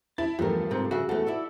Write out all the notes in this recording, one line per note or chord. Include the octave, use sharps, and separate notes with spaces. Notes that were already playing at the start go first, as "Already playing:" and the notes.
E4 A5
E2 G2 F3 A3 A#4
G#2 C3 C4
C#3 F#4 E5
E2 A3 A4
E4 D5 E5